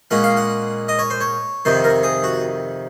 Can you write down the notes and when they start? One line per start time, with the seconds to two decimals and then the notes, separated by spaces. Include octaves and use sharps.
0.11 A#2 G#3 C#4 F#5
0.24 F5
0.37 F#5
0.88 D#5
0.99 C#5
1.10 C5
1.21 C#5
1.65 F2 C3 D#3 C5
1.84 A#4
2.03 G#4
2.24 F#4